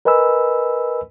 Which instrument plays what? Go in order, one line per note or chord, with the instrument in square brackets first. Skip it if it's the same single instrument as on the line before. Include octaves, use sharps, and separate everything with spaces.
[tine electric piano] A#4 B4 D#5 G#5 B5 E6